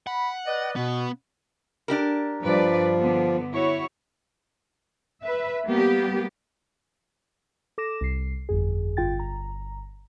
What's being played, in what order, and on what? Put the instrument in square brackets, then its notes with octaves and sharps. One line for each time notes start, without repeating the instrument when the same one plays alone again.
[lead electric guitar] F#5 [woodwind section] B5
[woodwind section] B4 D5 D#5
[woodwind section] B2 [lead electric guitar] B3
[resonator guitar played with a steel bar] D4 G4 A#4
[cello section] G2 B4 D5 [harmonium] F3
[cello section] D3 B3
E4 F#4 C#5
B4 E5
G3 A#3 B3 G4
[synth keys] A4 D6 A#6 E7
C2 C7
G1 F2 G#4
G1 F4 G5 A6
G1 A#5